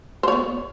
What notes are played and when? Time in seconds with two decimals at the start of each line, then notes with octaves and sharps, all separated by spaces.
0.23 C5
0.28 C#5
0.32 B3